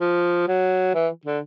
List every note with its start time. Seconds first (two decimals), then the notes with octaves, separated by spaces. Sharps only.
0.01 F3
0.48 F#3
0.94 E3
1.25 D3